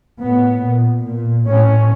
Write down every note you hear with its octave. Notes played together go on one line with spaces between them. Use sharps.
A2 B3
A#2
A#2
A2 C#4